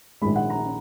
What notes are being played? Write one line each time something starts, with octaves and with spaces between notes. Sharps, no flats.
A#1 G#2 D#3 G#3 B5
F#5
A#5